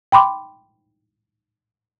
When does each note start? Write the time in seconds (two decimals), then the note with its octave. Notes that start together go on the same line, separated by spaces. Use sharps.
0.12 G5 B5 C6 D6